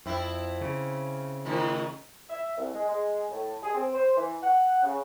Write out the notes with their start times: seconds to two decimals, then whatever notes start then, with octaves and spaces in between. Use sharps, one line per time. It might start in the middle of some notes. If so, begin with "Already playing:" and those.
0.06 F2 C4 E4
0.61 C#3
1.45 A2 D#3 F3
2.30 E5
2.58 C2
2.74 G#3
2.89 G#3
3.30 A2
3.63 G#4
3.74 C4
3.95 C5
4.16 E3
4.43 F#5
4.83 C#3